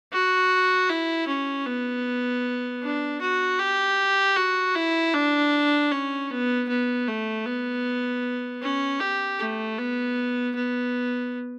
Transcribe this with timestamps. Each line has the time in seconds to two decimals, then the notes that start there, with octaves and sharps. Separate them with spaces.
0.12 F#4
0.90 E4
1.28 C#4
1.66 B3
2.83 D4
3.21 F#4
3.60 G4
4.36 F#4
4.75 E4
5.14 D4
5.92 C#4
6.30 B3
6.69 B3
7.08 A3
7.46 B3
8.62 C#4
9.00 G4
9.40 A3
9.79 B3
10.55 B3